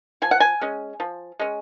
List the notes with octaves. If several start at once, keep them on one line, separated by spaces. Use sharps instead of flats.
F3 G#5
F#5
G#5
G#3 C#4
F3
G#3 C#4